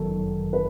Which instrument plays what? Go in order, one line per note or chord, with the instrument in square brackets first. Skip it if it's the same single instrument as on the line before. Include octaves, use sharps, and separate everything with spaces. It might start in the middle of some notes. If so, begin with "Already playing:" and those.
Already playing: [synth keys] G1 F#2 D#3 F#3 [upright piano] A4
[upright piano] B4